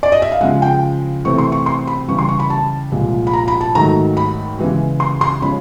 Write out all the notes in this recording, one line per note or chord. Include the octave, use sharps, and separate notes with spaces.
D5
D#5
E5
F5
C#3 F3 G#3 F#5
G5
C3 E3 A3 C4 E4 C#6
C6
C#6
C6
B5
C#3 E3 G3 C#6
C6
C#6
B5
A5
C2 A#2 F3 G#3
B5
A#5
B5
A5
G#2 D#3 F#3 A3 A#5
B5
C#3 E3 G#3
C6
C6
F3 G#3 C#4 B5